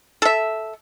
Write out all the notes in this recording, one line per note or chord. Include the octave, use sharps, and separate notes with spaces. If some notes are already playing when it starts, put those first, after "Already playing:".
A4 E5